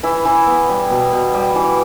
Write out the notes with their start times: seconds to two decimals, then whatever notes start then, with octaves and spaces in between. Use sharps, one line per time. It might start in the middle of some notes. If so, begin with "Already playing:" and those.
0.03 E3 E4
0.25 E3
0.47 B3
0.69 G3
0.90 B2
1.12 B2
1.33 G3
1.55 E3